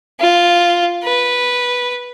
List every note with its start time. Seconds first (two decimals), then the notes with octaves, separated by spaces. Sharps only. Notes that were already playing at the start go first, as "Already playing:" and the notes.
0.20 F4
1.03 B4